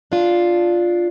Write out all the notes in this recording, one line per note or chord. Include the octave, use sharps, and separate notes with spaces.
D4 F4